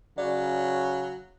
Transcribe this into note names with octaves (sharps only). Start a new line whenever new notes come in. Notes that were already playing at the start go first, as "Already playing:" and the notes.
C#3 F#3 D5